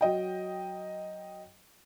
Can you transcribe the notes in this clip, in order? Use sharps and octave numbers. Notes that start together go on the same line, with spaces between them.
F#3 D#5 G5